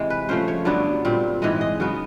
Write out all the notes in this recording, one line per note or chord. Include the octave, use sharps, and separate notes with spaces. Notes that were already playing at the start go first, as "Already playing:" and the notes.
Already playing: C3 E3 G#3
B4
C#3 F3 A3 C5
C#5
G2 D3 F#3 B3 D5
A#2 G3 C4
G#2 E3 G#3 D#5
D#5
C#3 F#3 B3